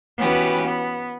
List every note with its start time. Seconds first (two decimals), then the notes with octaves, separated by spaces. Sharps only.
0.18 E3 B3 C#4 F#4 G4 B4
0.63 B3